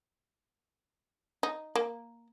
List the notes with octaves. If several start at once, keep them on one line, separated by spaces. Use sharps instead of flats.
D#4
A#3